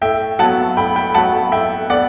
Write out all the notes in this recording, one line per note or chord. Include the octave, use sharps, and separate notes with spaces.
A2 E5 G5
F#3 B3 F#5 A5
A2 G5 B5
G5 B5
F#3 B3 F#5 A5
A2 E5 G5
B3 D5 F#5